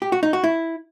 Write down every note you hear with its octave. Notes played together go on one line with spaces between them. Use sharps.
G4
F#4
D#4
F#4
E4